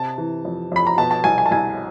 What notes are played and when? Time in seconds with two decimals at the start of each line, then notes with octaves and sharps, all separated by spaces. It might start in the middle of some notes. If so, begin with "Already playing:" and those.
Already playing: C3 A5
0.18 E3
0.45 F2
0.72 F2 B5
0.87 A#5
0.98 B2 A5
1.11 A5
1.24 C2 G#5
1.38 G#5
1.46 A5
1.51 C2 G#5